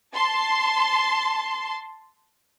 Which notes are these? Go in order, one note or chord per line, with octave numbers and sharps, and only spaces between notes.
A5 C6